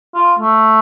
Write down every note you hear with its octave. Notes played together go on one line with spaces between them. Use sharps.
F4
A3